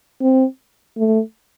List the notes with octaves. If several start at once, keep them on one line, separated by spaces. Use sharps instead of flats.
C4
A3